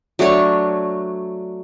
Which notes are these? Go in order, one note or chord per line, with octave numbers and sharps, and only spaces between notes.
F#3 A3 D4 C#5